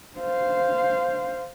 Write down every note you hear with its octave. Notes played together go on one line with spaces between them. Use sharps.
C5 F5